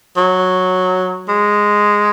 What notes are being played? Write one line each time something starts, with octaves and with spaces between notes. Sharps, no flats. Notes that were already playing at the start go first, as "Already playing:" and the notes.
F#3
G#3